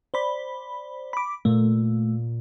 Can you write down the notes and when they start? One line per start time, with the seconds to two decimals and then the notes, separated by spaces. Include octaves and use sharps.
0.14 C5 D5 B5
1.13 B5 D6
1.45 A#2 A3